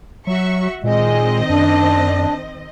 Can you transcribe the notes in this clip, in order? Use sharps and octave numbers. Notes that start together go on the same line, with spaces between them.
F#3 F#4 E5 C#6
A#2 D#3 G#3 C4 D#5
F#2 D4